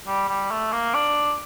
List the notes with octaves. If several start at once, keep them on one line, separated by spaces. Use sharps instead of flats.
G3
G3
A3
A#3
D4